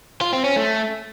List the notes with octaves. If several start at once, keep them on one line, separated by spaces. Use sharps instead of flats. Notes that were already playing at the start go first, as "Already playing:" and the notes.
F4
C4
C#4
A3